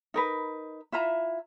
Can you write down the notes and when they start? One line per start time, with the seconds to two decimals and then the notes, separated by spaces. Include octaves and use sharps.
0.14 D#4 A#4 B4
0.92 E4 F4 E5 A#5